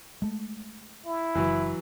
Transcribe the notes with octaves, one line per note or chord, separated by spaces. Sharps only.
G#3 A3
E4
F#1 E3 F#3 B4